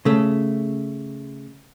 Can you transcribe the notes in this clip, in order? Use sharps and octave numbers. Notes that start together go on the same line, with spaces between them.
C#3 A3